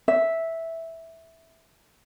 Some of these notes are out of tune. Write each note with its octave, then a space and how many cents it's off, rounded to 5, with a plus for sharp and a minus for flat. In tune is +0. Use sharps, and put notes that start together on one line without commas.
E5 -5